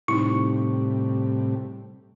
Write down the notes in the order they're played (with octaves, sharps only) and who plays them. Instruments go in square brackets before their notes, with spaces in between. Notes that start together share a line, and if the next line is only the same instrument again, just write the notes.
[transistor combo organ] A2 C3 G3 [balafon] D#4 E4 [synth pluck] C#6